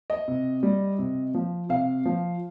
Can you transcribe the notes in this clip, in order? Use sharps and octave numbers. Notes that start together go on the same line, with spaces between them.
D#5
C3
G3
C3
F3
C3 F5
F3